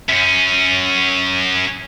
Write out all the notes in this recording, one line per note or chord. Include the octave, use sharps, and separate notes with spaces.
F#2 C#4